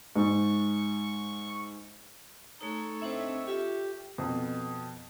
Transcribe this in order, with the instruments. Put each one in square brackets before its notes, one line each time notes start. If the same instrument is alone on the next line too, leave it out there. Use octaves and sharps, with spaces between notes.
[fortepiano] G#2 [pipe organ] C#6
[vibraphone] A3 D#4 A#5 [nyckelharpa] A4 C#5
[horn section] A2 D#4 E5 [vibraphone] C4 D4 C5
[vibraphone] F4 E5 [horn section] G4
[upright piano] F2 B2